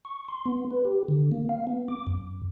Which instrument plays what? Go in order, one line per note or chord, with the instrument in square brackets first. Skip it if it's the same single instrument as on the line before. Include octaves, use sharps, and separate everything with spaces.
[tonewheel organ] C#6
C6
B3
B4
G4
D3
A#3
F5
B3
D6
F#2